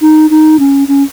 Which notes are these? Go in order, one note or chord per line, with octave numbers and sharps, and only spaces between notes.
D#4
D#4
C#4
C#4